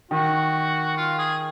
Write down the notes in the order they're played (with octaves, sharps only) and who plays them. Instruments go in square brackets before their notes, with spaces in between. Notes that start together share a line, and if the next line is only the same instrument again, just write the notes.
[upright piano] D#3 [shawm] F#4
[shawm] F4
G#4